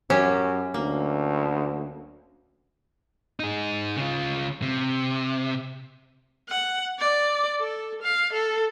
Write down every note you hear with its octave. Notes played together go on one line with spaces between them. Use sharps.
F#2 F#3 C#4 G4
D2 A#3
D#4 G#4
C#3 F4
C3
F#5
D5
A4
F5
A4